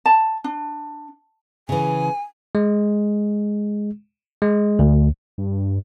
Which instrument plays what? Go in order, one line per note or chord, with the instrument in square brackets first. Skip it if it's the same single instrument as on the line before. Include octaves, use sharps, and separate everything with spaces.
[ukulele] A5
D4
[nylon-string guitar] C#3 E3 [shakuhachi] G#5
[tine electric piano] G#3
G#3
D2
[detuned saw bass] G2